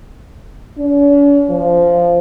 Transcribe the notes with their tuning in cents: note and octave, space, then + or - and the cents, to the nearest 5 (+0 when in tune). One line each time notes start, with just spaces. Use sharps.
C#4 +45
F3 -10